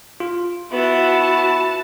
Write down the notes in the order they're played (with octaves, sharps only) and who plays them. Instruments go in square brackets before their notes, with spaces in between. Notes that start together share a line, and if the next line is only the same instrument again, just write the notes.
[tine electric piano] F4
[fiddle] B3 E4 [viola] F#4 A5